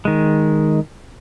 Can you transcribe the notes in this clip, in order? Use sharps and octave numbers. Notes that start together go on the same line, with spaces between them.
D#3 G#3